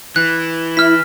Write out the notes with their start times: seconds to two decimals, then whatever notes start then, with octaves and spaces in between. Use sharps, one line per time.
0.16 E3 F#6
0.77 E4 F6 B6